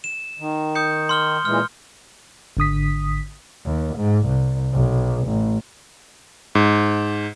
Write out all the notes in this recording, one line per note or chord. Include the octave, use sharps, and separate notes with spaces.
E7
D#3
D#6 G6 C#7
C6 F6 G7
A#2 E3 G#3 F6
G#1 D3 D#6 B6
D#2
G#2
C2
B1
A1
G#2